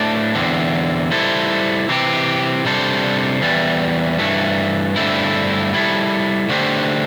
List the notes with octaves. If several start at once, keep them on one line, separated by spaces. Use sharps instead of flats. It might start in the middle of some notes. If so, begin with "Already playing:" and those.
Already playing: A2 A3 D4
E2 D3 C4
G3 E4 A4 C5
C3 E3 C4 G4
C3 G3 D4 A4 C5
E2 E3 G3
G2 E3 A3
G2 D3 A3 C4 E4
G3 E4 A4
D3 A3 D4 G4 C5